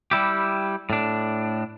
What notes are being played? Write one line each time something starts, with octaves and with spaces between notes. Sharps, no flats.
G3 E4 G4
A2 D4